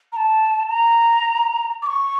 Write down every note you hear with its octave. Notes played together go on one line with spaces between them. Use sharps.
A#5
A5
A#5
D6
C#6